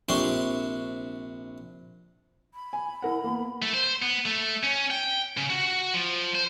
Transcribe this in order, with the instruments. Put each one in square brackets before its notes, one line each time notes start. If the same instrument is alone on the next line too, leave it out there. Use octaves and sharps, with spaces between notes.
[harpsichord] A#1 C3 D4 C5 C6 C#6
[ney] B5
[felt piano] G#5
E4 A#4 F#5
A#3 B3
[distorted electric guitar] A3
C5
B3
A3
C#4
G5
C#3
F#4
F3
C5